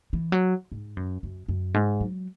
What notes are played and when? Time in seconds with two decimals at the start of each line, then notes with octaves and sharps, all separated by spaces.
0.13 E3
0.32 F#3
0.72 G#2
0.97 F#2
1.23 F#2
1.48 F#2
1.74 G#2
2.01 F#3